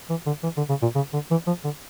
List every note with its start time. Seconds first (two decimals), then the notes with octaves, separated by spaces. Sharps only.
0.10 E3
0.26 D3
0.43 E3
0.57 D3
0.69 C#3
0.82 A#2
0.95 C#3
1.13 D3
1.31 E3
1.47 F3
1.64 D3